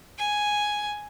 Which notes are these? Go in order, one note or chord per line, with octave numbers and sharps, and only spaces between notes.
G#5